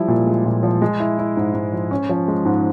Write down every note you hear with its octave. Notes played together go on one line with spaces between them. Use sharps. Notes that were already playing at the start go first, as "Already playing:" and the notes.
Already playing: F3 G3 E4
A#2
G#3
A#2
F3
G#3
E4
E4
G#2
G#2
F3
C#4
F3
G#3
G#2